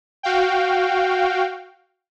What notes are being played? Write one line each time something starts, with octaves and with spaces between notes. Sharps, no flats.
F#4 F5 G5